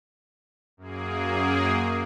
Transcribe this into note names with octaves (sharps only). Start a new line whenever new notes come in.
F#2 A#3 G#4